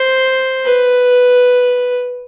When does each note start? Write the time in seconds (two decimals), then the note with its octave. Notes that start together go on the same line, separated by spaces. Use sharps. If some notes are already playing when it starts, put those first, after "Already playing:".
Already playing: C5
0.66 B4